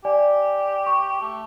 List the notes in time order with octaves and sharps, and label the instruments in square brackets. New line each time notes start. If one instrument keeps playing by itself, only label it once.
[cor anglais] G4 [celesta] D5 G#5
[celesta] C#6
[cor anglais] A3